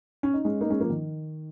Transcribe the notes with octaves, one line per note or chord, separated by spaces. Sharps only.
C#4
D#4
G#3 C#4
A#3 D#4
G#3 C#4
F3 A#3
D#3